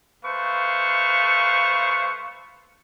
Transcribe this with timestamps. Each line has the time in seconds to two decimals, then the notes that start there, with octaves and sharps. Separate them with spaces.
0.24 A3 B4 C5 F5 C#6